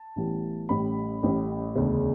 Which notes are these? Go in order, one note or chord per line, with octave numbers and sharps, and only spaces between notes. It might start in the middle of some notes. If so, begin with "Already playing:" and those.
Already playing: A5
A1 A2 E3 G3 B3
A1 A2 G3 C#4 B5
A1 A2 G3 C#4
E1 D2 C#3